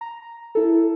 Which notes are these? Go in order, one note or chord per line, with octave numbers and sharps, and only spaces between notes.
A#5
E4 A4